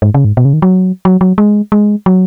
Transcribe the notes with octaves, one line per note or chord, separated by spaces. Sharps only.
G#2
C#3
G#2
B2
C#3
D#3
F#3
F#3
F#3
G#3
G#3
F#3